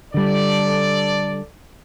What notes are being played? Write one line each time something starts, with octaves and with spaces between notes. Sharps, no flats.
D3 G3 A4 D5